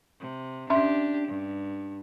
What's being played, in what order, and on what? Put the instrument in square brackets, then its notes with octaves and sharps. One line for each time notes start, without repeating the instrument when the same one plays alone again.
[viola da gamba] C3
[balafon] C#4 E5 C6 [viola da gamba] D4 G4
[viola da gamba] G2